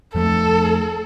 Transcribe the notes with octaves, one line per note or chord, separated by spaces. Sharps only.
F2 F3 A3 A4